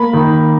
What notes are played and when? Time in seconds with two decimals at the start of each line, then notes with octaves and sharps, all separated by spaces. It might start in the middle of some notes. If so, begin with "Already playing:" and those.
Already playing: A#3 B5
0.13 D#3